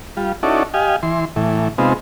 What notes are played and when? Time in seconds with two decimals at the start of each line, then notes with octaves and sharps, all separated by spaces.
0.17 G3 F4
0.43 C#4 D#4 E4 F#4 A4 D5
0.74 G4 D#5 F5 G#5
1.03 E3 C6
1.36 A2 E3
1.78 C3 G#3 B3 C4 D#4 F4